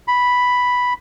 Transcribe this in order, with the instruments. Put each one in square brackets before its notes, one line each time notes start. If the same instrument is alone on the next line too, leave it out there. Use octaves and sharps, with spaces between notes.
[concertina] B5